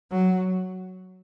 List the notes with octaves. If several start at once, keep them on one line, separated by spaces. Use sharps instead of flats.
F#3